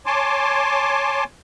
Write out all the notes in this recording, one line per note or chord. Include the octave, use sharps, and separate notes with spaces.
C#5 G#5 A5 C6 D6